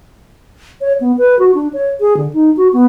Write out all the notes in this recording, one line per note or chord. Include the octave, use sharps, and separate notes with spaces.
C#5
B3
B4
F#4
D4
C#5
G#4
D3
D#4
F#4
B3